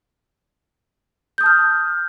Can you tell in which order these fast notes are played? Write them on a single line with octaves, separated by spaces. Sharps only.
G6 D#6 A5 F6